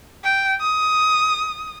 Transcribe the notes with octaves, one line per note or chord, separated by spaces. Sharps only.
G5
D#6